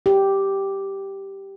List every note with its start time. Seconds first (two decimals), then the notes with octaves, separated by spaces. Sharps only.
0.06 G4